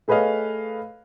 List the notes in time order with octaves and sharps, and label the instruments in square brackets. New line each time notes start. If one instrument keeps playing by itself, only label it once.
[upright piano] A3 G#4 B4 C#5 D#5 F5